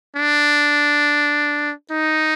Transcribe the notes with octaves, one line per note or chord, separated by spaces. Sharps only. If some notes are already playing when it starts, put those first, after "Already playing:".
D4
D#4